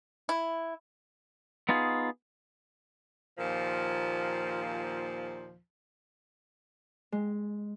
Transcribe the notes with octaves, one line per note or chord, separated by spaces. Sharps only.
E4
B3 D#4 F4 G#4
D#2 A#2 F3
G#3